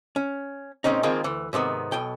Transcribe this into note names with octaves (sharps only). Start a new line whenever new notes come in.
C#4
A#2 G#3 C4 C#4 D#4
D#3 F3 G#3 A#3 C4 G#4
D2 E3
G#2 C3 D#3 B3
B1 B2 G5